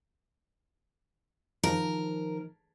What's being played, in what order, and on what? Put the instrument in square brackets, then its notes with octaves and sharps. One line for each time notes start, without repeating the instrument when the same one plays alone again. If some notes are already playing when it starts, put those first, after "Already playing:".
[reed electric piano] D#3 F3 D#4 [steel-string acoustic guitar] A#4